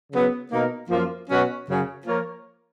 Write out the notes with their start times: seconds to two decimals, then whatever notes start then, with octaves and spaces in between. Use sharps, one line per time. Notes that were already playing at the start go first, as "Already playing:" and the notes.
0.12 C#3 F#3 B3
0.51 B2 A#3 D#4 A#4
0.90 F#2 F3 A#3 F4
1.29 B2 F#3 C#4 F#4 B4
1.67 F#2 C#3 F#3 C#4
2.06 F3 A#3 F4 A#4 C#5